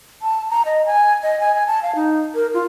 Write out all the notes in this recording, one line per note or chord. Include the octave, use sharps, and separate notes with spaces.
A5
A#5
D#5
G#5
D#5
G#5
G#5
A5
F5
D#4
A#4
F4